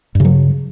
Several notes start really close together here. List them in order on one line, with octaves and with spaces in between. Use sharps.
G2 C#3 F#3